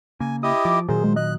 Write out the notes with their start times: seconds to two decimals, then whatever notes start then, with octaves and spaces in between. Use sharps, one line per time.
0.20 C#3 A#3 G#5
0.43 E4 G4 D#5 D#6
0.65 F3 D6
0.89 A#2 D#3 F#3 G#4 C5
1.04 G#3
1.16 D#5 F#6